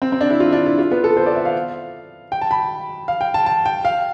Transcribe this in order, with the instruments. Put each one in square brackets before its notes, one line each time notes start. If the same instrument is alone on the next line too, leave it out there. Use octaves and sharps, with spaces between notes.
[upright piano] C4
C4
D4
E4
F4
D4
E4
F4
B3
A4
C5
D5
E5
F5
G5
A5
B5
F5
G5
A5
A5
G5
F5